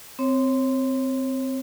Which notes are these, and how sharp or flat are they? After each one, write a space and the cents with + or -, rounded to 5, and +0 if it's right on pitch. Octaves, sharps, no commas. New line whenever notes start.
C4 -10 C#5 -25